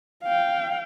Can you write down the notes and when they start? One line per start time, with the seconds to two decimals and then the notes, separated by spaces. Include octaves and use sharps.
0.23 F5 G5